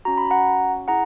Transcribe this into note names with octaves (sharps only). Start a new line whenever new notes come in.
C#4 F#4 A#5
B5
F#5 A#5
E4 G#4 F#5 A#5